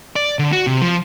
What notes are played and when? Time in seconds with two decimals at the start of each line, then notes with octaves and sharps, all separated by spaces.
0.16 D5
0.39 D3
0.52 F#4
0.67 C3
0.82 F3